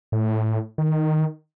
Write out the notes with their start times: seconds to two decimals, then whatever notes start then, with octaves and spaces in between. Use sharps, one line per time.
0.12 A2
0.78 D#3